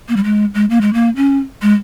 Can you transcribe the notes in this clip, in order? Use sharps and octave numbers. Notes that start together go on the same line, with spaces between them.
A#3
G3
G#3
G#3
A#3
G#3
A#3
C#4
G#3